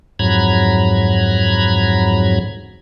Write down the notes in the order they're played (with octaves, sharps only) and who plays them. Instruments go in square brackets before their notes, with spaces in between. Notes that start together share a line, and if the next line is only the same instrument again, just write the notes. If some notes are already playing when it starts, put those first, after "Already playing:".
[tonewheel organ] F2 G#2 F#3 A#5 B5 G#6